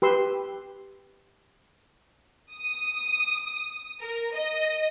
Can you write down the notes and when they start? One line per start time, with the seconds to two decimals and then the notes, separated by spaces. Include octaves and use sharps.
0.02 G4 B4 C6 E6
2.52 D#6
4.00 A#4
4.33 D#5